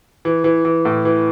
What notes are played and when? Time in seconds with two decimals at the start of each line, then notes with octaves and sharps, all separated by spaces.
0.25 E3
0.44 E3
0.65 E3
0.85 A2
1.05 E3